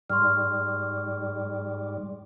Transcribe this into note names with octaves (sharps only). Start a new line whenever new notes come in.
G#2 G3 C6 C#6 F6